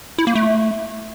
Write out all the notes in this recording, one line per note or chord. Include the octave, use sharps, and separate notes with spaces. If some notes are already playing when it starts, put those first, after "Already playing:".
E4
A#3
A3